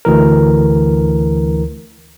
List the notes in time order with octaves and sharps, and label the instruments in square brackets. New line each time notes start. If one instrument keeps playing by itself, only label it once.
[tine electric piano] D2 E3 A#4